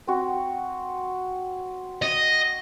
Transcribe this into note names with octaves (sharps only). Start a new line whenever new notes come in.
C4 F#4
D#5